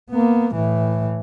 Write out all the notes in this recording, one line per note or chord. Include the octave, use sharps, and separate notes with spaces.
A#3 B3
A2 E3